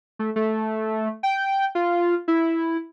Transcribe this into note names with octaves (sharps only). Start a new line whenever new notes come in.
A3
A3
G5
F4
E4